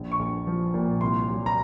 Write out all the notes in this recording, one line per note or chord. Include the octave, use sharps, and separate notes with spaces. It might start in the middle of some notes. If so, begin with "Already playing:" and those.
Already playing: A#1
C#6
A#1
F3
A#2
C2 C6
F#3
A#5